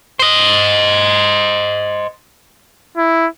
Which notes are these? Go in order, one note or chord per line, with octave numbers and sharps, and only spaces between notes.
C5 D#5
E4